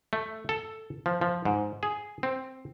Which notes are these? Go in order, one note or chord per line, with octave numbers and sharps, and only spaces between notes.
A3
A4
F3
F3
G#2
G#4
C4